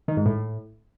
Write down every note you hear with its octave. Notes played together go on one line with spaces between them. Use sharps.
D#3
G#2
A2